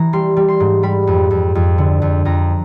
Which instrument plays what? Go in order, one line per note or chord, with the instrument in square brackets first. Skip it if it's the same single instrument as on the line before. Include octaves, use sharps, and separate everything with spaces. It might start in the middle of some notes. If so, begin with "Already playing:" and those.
Already playing: [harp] E3 A#5
G3 C6
G3
C6
G#2
G3 B5
F2
F2
F2
D3
F2
F2 A#5